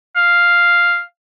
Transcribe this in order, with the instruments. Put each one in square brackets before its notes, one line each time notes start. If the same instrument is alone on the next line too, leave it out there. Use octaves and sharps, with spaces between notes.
[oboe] F5